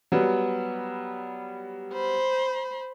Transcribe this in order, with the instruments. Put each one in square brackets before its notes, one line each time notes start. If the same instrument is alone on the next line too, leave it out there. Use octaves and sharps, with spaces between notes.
[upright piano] F#3 G3 B3
[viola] C5 B5